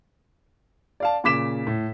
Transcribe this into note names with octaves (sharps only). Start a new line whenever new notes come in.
D5 F5 A5
A#2 C#3 D6 B6 E7
A2